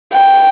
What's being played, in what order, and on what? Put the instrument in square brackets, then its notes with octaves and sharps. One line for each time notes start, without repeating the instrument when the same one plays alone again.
[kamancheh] G5